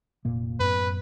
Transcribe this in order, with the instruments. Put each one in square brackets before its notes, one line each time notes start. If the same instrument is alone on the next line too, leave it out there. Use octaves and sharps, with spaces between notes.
[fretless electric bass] F1 A#2 A#3
[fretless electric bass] F#2 A2 B3 [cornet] B4